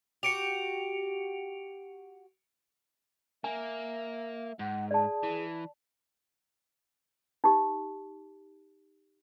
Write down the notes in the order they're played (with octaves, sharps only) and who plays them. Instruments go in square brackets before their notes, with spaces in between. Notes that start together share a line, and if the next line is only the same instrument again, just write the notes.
[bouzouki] F#4 G4 [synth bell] C#7 D7 F7
[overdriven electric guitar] A#3 [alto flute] E5 [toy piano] G#5
[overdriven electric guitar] G#2 [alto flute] F#5
[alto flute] G#4 [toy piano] D5 A5
[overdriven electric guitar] E3
[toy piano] D#4 G4